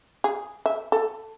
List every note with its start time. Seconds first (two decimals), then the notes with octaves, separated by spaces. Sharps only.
0.24 G#4
0.66 E5
0.92 A4